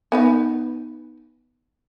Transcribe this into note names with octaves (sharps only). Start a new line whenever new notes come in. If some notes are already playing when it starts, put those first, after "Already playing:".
B3 D#4 B4